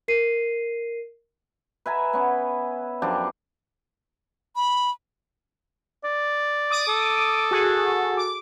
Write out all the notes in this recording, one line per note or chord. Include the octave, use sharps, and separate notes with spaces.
A#4 C7 D#7
B4 E5 G#5 A#5
B3 C#4
F#2 F3 D4 G4
B5
D5
D6 D#6
A4
F#4 G#4
D6